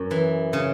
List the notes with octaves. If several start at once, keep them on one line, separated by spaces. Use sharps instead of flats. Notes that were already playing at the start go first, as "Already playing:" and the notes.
Already playing: F#2
E3
C#3